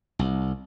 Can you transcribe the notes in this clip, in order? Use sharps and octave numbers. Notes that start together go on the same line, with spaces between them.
C2